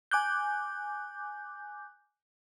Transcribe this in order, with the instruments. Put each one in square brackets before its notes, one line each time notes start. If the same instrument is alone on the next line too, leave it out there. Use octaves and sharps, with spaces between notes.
[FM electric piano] G#5 D6 F#6 G6